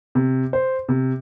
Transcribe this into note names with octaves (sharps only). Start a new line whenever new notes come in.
C3
C5
C3